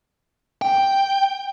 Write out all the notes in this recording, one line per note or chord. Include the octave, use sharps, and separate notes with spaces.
G5